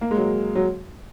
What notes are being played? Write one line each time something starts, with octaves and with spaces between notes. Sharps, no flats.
A#3
G#3
F#3
F#3